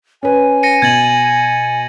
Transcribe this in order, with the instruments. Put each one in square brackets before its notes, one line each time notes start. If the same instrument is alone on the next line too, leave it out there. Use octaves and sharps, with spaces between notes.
[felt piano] C#4 B4 [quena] G#5
[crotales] A#6 C#7 D#7
[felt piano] B2 [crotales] G#6 A6 F#7